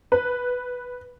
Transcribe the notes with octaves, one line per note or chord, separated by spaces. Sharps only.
B4